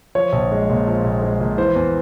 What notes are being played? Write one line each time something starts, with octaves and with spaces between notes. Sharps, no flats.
F3 C#5
A#1
G#3
A#2
F3
A#1
G#3
A#2
E3 C5
E2